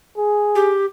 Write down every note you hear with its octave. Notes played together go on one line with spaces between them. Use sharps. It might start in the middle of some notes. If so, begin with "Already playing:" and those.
G#4
G4